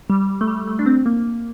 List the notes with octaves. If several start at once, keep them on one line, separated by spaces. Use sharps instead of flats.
G3
A3
G3
A3
D4
C4
A#3